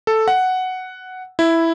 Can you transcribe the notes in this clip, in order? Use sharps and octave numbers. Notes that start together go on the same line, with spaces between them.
A4
F#5
E4